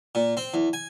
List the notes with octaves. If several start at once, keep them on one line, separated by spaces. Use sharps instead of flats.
A#2
C4
E2
G#5